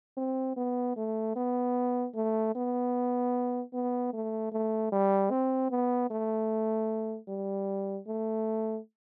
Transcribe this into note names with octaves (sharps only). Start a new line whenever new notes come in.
C4
B3
A3
B3
A3
B3
B3
A3
A3
G3
C4
B3
A3
G3
A3